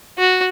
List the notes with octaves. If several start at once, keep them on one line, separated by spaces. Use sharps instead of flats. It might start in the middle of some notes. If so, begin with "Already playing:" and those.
F#4